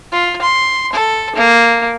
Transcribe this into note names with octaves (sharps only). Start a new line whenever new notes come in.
F4
C6
A4
A#3